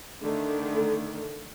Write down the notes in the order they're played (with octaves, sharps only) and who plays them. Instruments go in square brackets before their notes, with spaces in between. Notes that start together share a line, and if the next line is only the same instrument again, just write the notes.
[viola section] D3 D#3 A3